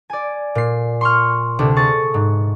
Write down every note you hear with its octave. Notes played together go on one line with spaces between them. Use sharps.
D5 G#5
A#2 C7
C6 C#6 F6
D2 C3 D4
G#4 C#6 A6
G#2